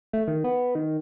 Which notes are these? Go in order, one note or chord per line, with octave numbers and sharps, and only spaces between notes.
A3
D#3
B3
D#3